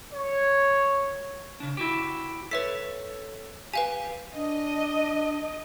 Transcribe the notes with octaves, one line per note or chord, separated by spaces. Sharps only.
C#5
C#3 D4
E4 F#4 G4
A4 B4 C#5 E5 B6
G4 B4 F5 G#5
D4 D#5